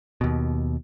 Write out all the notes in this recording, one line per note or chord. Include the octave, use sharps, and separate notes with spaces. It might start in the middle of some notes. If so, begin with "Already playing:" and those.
D#2 B2